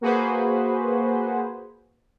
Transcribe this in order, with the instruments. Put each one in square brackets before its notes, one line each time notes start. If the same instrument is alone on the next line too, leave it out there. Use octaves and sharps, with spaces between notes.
[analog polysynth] A#3 F#4 G#4 B4 C5